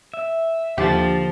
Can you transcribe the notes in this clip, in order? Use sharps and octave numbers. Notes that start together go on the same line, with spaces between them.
E5
D#2 D3 F3 G4 A6